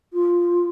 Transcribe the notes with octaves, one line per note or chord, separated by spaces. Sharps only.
F4